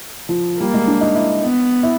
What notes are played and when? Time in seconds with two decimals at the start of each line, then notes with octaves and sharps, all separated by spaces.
0.29 F3
0.60 G3 A#3
0.74 G#3
0.88 D4
1.01 D#4
1.14 E4
1.42 B3
1.83 E4